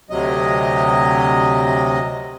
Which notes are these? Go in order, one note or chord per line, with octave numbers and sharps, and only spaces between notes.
D2 C3 F#3 D#5